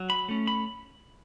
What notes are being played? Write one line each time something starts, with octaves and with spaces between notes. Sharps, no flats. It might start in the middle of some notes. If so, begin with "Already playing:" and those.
Already playing: F#3
B5
A3 C#4
B5